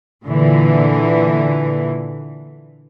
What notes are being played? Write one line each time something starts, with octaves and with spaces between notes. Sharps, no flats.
A#2 D3 E3